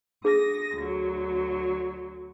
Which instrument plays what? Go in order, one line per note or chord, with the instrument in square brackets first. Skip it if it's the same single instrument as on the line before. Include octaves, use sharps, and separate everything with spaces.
[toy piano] D4 G#4 [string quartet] D#6 A#6
[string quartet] D2 F#3